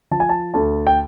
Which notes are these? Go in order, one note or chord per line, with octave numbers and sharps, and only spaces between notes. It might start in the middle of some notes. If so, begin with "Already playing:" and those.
F3 A5
G#5
A5
D2 A5
G5